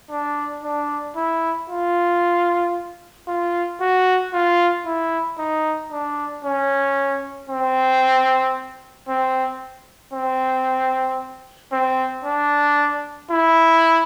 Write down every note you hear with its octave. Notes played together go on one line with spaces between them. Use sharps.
D4
D4
E4
F4
F4
F#4
F4
E4
D#4
D4
C#4
C4
C4
C4
C4
D4
E4